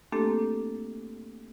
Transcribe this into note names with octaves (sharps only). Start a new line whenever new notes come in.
A3 A#3 C4 D4 G4 A4